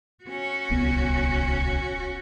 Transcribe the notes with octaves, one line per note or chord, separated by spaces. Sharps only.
C#4 F#4
D1 C2 B3